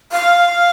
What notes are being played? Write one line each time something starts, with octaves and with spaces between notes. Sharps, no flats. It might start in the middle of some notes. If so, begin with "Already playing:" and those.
F5